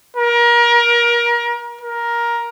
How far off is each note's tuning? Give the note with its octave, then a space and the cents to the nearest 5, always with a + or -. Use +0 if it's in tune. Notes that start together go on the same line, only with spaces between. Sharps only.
A#4 +30
A#4 +15